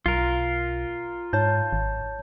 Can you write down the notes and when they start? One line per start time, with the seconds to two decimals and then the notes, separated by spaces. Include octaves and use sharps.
0.06 B1 F4 A#4
1.33 G#2 C#5 A5 G6
1.73 G#1